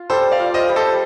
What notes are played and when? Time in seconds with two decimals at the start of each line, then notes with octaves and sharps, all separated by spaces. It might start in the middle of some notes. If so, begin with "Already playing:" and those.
Already playing: F4
0.10 G3 A4 C5
0.31 D5 F5
0.39 F4
0.54 C5 D#5
0.69 G3
0.76 A4 C5